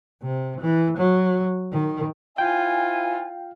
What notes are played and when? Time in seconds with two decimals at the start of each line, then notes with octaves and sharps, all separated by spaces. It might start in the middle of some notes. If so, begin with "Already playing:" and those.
0.22 C3
0.61 E3
0.97 F#3
1.72 D#3
2.38 E4 F4 C5 G5 G#5